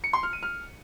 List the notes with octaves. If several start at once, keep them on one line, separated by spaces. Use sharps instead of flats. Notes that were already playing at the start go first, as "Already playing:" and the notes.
C#7
C6
F6
D#7
F6